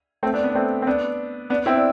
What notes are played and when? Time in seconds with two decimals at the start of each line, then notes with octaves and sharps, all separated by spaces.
0.23 A3 C4
0.34 B3 D4
0.44 B3
0.49 D4
0.55 A3 C4
0.82 C4
0.87 B3 D4
1.50 B3 D4
1.66 C4 E4
1.76 D4